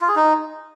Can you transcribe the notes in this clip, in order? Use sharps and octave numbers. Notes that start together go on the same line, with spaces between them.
F4
G#4
D#4